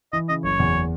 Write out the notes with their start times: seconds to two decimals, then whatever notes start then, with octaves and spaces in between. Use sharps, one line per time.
0.13 E3 D#5
0.29 C#3 D#5
0.44 F#1 C#5
0.59 E2